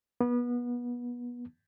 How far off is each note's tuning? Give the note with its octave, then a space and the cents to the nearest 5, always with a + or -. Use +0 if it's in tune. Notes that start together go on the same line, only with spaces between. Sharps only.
B3 -25